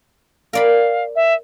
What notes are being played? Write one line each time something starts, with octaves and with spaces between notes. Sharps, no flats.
A#4 D5 F5 B5
E5